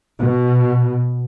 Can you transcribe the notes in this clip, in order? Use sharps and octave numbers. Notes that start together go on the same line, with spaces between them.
B2